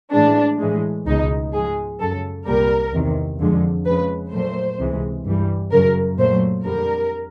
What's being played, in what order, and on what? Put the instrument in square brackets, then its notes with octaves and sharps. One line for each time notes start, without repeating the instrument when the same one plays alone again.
[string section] A2 E3 G#3 D4
A2 E3 G#3
C#2 B2 G#3 D#4
G#2 F3 G#3 G#4
F#2 C#3 F#3 A4
C2 A#2 G3 A#4
E2 C3 D#3
F2 D3 F3 G#3
F2 C#3 F3 G#3 B4
A#2 F#3 A3 C5
C#2 C3 E3 G#3
G2 E3 G3
F#2 C#3 F#3 A#4
A#2 F#3 A3 C5
F2 D3 G3 A#4